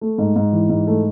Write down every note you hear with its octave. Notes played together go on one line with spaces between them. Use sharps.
A3
G#2
G#2
E3
G#2
A3